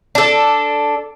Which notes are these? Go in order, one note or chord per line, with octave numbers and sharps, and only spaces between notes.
D4 A4